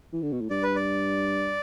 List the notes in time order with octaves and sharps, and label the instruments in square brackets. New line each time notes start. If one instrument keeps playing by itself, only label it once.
[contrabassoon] E3
D3
B2
A2
[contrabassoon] G2 [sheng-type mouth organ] D5
[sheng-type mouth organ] B4
D5